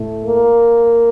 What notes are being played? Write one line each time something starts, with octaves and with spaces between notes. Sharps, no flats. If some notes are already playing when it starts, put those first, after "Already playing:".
Already playing: A2 A3
A#3